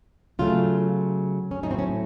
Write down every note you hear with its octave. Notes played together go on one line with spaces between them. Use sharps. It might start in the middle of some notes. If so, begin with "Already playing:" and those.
C#3 F#3 A3 F4
C#4
A2 F#3 A3 D#4
C4
C#4